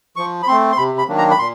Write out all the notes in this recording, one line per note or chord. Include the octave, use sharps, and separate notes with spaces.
F3 C#6
B5
A3 C4 C6
C6
C3 B5
B5
D#3 F#3 A#3 D4
A#5
B5
A#2 C6